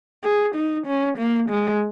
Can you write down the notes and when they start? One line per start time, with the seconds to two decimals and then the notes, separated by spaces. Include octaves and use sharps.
0.24 G#4
0.55 D#4
0.87 C#4
1.18 A#3
1.49 G#3